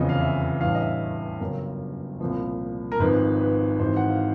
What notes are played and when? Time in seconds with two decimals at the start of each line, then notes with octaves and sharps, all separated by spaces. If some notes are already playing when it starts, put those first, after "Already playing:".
Already playing: F1 E2 C#3 F3 D#5
0.09 F5
0.20 E5
0.60 A1 G2 E3 F5
0.75 D#5
0.81 E5
1.40 G1 F#2 C#3 A#4
2.20 C2 A#2 F3
2.92 A#4
2.99 G#1 G#2 F3 B4
3.41 B4
3.79 G#1 G#2 E3 C5
3.97 F#5
4.09 F5